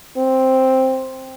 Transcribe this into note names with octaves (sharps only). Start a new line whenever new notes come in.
C4